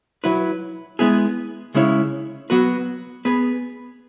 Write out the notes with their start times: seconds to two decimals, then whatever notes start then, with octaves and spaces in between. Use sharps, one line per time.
0.24 F#3 E4 B4
0.99 G#3 B3 E4 G#4
1.74 C#3 G#3 C#4 E4 C#5
2.50 F#3 B3 F#4 B4
3.25 B3 G#4 B4